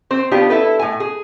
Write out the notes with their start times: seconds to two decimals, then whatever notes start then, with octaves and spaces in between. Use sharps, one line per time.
0.11 C4 C5
0.31 B3 D4 F4 G4
0.50 E4 A4 B4
0.79 A2 G#5
1.00 G#4